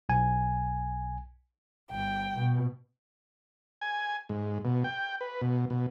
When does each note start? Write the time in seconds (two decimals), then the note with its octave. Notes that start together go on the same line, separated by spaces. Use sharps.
0.09 B1 G#5
1.91 G1 G5
2.37 B2
3.81 G#5
4.29 G#2
4.65 B2
4.84 G5
5.21 B4
5.41 B2
5.70 B2